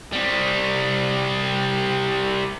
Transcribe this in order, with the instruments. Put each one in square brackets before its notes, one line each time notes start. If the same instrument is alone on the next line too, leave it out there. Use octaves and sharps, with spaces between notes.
[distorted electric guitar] C3 G3